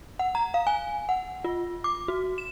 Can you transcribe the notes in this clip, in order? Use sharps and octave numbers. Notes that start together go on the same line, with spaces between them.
F#5
A#5
F5
G#5
F#5
F4
D6
F#4
E7